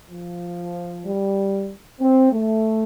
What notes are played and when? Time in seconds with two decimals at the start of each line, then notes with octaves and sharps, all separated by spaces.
0.10 F3
1.05 G3
2.01 C4
2.32 A3